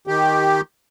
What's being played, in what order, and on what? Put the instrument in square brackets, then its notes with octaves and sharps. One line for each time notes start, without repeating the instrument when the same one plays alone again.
[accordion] D#3 G4